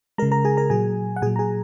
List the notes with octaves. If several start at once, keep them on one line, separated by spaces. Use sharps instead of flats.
C#3 G#3 A#4 A#5
A#4 A#5
G#4 G#5
A#4 A#5
A#2 F#3 G#4 G#5
F#5
A#2 F#3 G#4 G#5
A#5
G#4 G#5